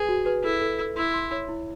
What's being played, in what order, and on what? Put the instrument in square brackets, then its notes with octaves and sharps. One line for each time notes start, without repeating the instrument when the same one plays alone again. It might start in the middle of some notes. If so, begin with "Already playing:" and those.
Already playing: [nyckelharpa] G#4 [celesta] B4
[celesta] F#4
B4
[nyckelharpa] E4 [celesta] A4
[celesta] A4
A4
[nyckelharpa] E4 [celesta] C6
[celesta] C6
C#5
E4